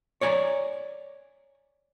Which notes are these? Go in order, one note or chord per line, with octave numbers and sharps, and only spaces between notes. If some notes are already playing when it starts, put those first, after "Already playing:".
C#5 D5 G#5 A#5